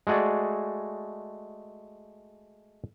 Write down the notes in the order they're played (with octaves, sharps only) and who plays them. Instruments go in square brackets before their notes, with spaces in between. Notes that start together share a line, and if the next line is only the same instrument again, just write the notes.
[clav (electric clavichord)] G#3 A3 F#4 G#4 D5